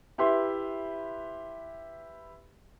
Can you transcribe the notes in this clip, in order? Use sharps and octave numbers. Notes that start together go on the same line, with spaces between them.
E4 G4 B4 E5 C6